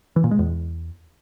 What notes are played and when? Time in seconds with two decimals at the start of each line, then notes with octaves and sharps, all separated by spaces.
0.16 E3
0.24 A#2
0.31 G#3
0.39 E2